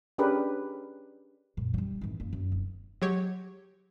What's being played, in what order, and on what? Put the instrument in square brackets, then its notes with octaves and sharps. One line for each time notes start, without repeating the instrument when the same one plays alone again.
[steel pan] C#4 D4 G4 G#4 A#4 B4
[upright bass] F#2 A#2
F#3 G3
G#1 E3
F#2 A#3
F#2
F1
[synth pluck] F#3 G#3 G4 C#5